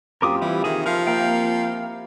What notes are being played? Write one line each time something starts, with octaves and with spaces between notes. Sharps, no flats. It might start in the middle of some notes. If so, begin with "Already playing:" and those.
F#2 C4 F4 G4 A#4 D6 D#6
E3 G3 E4
C3 D#3 G#4
F3 A#4 F5
A#3 A#4 F5 G5